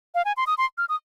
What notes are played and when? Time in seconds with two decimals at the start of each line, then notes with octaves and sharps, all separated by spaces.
0.15 F5
0.25 G#5
0.37 C6
0.47 D#6
0.58 C6
0.78 F6
0.89 D#6